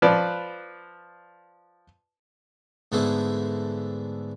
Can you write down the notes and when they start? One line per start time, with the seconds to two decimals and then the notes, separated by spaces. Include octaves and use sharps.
0.02 F3 B4 D5
2.92 G#2 D3 A3 B3 E4 G#4